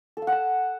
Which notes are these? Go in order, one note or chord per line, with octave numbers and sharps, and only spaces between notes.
A4
F5
F#5
A5